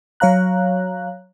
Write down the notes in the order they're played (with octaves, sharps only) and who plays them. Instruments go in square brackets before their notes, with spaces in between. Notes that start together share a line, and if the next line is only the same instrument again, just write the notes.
[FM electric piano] F#3 C#5 F5 A#5 F#6